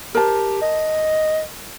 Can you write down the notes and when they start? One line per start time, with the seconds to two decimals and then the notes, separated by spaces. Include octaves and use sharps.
0.15 G4 A#4 C5 A5
0.62 D#5